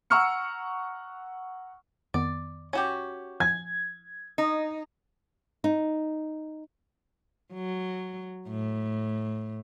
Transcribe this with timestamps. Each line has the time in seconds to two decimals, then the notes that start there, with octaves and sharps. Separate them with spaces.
0.10 F#5 A#5 C#6 E6 F6 C#7
2.14 F2 D#3 B3 D5
2.73 C#4 F#4 G4
3.40 F3 G#5 G#6
4.38 D#4
5.64 D#4
7.53 F#3
8.49 A2